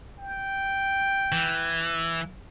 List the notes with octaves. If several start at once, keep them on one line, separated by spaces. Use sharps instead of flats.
G5
E3